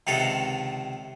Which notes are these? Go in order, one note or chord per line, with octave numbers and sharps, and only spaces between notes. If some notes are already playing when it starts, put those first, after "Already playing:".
C#2 C3 D#3 A4 B4 A#5